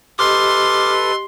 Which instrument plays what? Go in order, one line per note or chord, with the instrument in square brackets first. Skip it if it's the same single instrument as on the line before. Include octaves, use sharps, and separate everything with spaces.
[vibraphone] G4 D#5 [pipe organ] A4 B4 [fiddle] C6 [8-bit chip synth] D6 F6